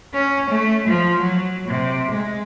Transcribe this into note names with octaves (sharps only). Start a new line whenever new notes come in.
C#4
A3
F3
F#3
C3
G#3